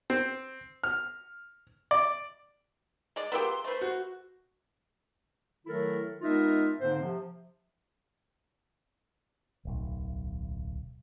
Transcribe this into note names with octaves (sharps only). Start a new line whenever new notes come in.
C4
F6
D5
G#3 D5
B3 F4 G4 G#4 A#4 A#5 C6
A3 B4 C5
F#4
D#3 F#3 A3 E4 A4 A#4
G#3 B3 D#4 F4 A#4 E5
G#2 D3 A#3 C4 C5
C3 F3
D1 B1